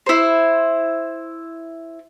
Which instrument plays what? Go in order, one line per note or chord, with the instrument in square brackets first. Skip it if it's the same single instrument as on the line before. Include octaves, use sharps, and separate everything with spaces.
[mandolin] E4 C5